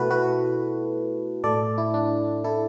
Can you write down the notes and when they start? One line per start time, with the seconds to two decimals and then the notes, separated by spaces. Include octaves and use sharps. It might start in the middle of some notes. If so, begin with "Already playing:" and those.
Already playing: B2 A3 E4 F#4 A4 B4
0.10 F#4 B4
1.44 A2 A3 A4 D5
1.78 E4
1.94 D4
2.44 E4 A4